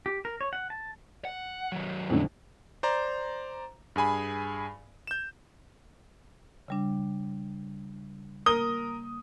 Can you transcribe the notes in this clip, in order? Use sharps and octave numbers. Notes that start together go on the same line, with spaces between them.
G4
A#4
C#5
F#5
A5
F#5
D#3 F#3
F2 A2 D3
C5 D5 A#5
G2 G#4 G#5 B5
G6 E7
C#3 G3 D4
A#3 A#4 D#6 G7